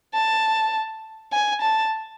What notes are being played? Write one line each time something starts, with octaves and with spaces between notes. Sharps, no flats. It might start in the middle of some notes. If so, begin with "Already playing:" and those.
A5
G#5
A5